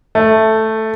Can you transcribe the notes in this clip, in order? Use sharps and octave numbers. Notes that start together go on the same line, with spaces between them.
A3